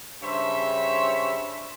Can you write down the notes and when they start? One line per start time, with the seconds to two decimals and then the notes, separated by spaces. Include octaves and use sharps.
0.22 G2 C#3 C5 C#5 E5